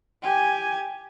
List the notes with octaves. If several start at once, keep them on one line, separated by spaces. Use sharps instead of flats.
G4 G#5